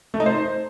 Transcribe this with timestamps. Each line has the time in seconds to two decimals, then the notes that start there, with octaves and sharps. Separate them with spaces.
0.14 A3
0.20 D#4
0.26 C5